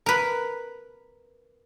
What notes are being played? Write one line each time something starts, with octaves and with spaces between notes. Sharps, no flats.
A#4 B4